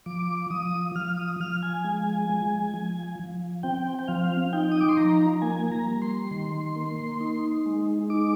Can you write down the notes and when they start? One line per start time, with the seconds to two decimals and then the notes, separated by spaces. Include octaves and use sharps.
0.06 F3 D6
0.50 F3 D#6
0.95 F3 F6
1.17 D#6
1.40 F3 F6
1.62 G#5
1.84 G#3
2.29 G#3
2.74 F3
3.19 F3
3.63 C4 G5
3.99 G5
4.08 F3 F5
4.53 D#4 G5
4.72 D#6
4.80 D6
4.89 C6
4.97 F3 A#5
5.42 A#3 G#5
5.72 A#5
5.86 G3
6.02 C6
6.31 D#3
6.76 A#3
7.20 D#4
7.66 G#3
8.10 D#4 D6